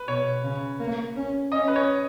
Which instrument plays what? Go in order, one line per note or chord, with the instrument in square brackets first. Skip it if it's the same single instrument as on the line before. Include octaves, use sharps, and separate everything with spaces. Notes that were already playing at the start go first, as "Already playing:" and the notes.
Already playing: [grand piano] B4
[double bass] B2 [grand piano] C#5
[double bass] C#3
A#3
C#4
[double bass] C#4 [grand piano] D#5
[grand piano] B4
C#5